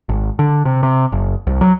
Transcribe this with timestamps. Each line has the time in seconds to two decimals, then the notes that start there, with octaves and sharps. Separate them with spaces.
0.09 G#1
0.39 D3
0.65 C3
0.83 C3
1.12 F#1
1.47 C2
1.61 F#3